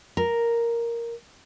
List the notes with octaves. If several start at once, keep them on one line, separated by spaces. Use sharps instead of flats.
A#4